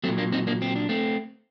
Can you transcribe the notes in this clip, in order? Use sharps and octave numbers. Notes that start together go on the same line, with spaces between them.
A#2 F#3 A3 C4
A#3 D4
C4 D#4
A#3 D4
C4
D4
A3 C4